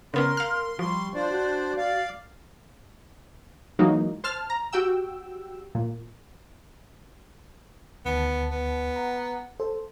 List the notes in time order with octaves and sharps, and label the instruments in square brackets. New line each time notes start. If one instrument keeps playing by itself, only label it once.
[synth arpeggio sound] C#3 B3 C#4 [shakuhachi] A#4 [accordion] C6
[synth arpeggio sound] F5 F6
[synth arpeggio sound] F3 [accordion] G3 C6 [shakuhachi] C#6
[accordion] D4 C5 D5 [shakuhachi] F4
[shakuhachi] F#4
[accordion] D5 F5
[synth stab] E3 F#3 G#3 A#3 D#4
C5 A5 F6
A#5
F#4 G4 G5 E6
A#2
[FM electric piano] D2 D#3 A5 [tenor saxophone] B3
[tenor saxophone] B3
[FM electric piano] F#5 A#5
A4 C5